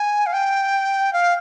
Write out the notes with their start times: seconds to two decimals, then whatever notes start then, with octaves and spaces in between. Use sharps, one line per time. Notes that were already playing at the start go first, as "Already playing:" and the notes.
Already playing: G#5
0.26 F5
0.33 G5
1.13 F5